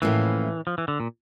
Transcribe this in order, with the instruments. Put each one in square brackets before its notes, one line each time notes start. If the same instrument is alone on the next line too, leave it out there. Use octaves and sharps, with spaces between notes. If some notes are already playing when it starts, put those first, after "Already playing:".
[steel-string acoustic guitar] A2 F3 A#3 C#4 [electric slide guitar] E3
[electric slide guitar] F3
E3
D3
A#2